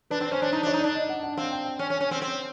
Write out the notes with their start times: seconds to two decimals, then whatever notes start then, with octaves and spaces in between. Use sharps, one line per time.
0.10 D4 B4
0.21 C4
0.32 C#4 C5
0.42 D4
0.52 D#4 C5
0.63 D4 C#5
0.73 D#4
0.80 D4 D5
0.95 D#5
1.09 F#5
1.23 F#5
1.37 C4 F5
1.52 G5
1.65 G5
1.79 C#4
1.90 C#4
2.01 C#4
2.11 C4
2.22 C4